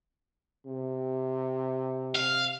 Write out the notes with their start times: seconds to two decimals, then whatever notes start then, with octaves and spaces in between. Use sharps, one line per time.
0.66 C3
2.15 F5